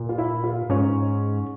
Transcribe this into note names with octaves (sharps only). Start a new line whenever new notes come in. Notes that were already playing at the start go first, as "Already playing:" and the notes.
Already playing: A#2
F4
E4
F4
G#2 C#4